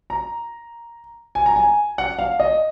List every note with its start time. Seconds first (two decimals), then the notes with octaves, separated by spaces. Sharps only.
0.10 A#5
1.35 G#5
1.46 A#5
1.56 G#5
1.98 F#5
2.19 F5
2.40 D#5